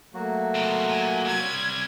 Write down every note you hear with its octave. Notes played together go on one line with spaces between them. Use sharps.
F#3 A3 A#3 F#4
B2 C4
A#2 G#5
C3 G3 G#6